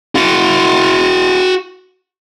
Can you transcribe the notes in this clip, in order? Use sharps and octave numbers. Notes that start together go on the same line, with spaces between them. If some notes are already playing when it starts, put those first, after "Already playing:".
F#4 F5